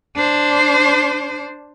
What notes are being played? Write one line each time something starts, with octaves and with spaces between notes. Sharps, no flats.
D4 C5